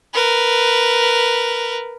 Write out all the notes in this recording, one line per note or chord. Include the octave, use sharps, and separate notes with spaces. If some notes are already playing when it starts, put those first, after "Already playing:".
A#4 B4